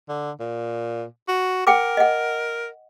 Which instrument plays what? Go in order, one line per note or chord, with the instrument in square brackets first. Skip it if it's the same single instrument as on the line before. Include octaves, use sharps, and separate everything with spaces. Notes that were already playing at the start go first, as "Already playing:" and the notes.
[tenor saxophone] D3
A#2
F#4
[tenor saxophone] A#4 [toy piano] F#5 G5 D6
[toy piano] D#5 F#5